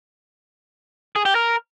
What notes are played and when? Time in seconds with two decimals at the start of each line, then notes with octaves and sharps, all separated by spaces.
1.16 G#4
1.25 G4
1.35 A#4